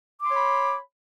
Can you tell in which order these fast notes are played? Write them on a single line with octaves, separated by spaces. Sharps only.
D6 C6 C#5 B5